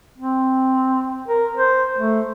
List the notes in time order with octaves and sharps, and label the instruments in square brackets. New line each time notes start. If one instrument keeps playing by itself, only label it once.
[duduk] C4
A#4
C5
A3